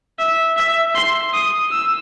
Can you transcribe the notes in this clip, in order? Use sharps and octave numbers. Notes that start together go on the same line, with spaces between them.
E5
E5
C6
D#6
E6